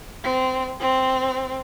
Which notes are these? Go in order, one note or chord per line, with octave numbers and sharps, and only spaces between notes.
C4
C4